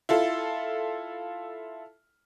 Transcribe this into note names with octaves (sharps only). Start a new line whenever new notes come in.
E4 F4 A4